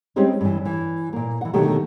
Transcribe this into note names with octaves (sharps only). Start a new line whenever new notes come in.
G3 G#3 C4 C#4 D#4 G4
G2 E3
E3
A#2 A#3
E3 F#5
B2 D3 D#3 F#3 A3 G4